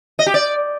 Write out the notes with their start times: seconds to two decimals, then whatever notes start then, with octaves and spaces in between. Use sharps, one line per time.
0.19 D#5
0.26 G4
0.34 D5